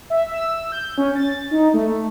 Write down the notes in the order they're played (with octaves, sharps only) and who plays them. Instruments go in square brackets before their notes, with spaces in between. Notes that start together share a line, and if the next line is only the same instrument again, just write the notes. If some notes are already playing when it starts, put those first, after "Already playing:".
[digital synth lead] E5
E6
G6
C#4
A6
D#4
A3